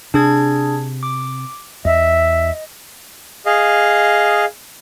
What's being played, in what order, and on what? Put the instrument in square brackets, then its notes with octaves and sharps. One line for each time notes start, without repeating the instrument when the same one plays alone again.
[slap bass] C3 [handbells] D4 G#4 G#6
[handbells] D6
[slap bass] E2 [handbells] D#5 [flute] E5
[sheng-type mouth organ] G#4 D#5 F5